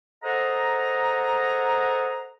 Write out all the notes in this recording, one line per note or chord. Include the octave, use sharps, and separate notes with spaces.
G#4 A4 C5 D#5 F#5 A#5